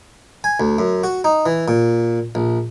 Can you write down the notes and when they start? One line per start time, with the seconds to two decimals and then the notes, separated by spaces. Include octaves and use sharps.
0.44 G#5
0.60 D2
0.79 F#2
1.04 F#4
1.24 D#4
1.46 E3
1.68 A#2
2.35 A#1